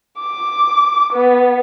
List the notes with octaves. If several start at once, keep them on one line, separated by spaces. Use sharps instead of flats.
D6
B3